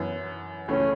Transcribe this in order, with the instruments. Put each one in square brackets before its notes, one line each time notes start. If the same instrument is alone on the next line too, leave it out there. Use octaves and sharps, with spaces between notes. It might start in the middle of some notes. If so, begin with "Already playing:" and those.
Already playing: [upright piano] F#2 E3 B3
[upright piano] C#2 C#3 E3 A3 [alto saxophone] C#4